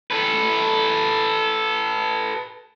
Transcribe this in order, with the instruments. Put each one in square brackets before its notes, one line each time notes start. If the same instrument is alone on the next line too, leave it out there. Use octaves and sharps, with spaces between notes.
[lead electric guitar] A4 B4